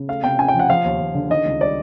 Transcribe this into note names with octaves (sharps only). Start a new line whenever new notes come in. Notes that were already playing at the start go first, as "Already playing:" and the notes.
Already playing: C#3
A3 F5
C3 G5
C#4 G#5
G5
F3
F#5
F3 F5
D#2
D#2
D3
D#3 D#5
C#2
G3 D5